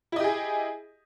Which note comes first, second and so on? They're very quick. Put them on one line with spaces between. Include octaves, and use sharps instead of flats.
E4 D#5 G4 G#4